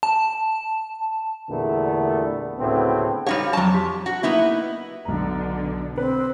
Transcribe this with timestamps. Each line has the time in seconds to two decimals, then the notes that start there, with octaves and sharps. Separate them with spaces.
0.03 A5
1.50 E2 A#2 D3 G3 A3 B3
2.59 D2 A2 C#3 B3 C4
3.26 G3 D#4 F#4 G4 C#5 F5
3.53 F2 F#3 C#5 A5
3.74 G4
4.06 F#4
4.23 A#3 B3 D#4 E4
5.05 B1 B2 D3 A#5
5.98 C4 B4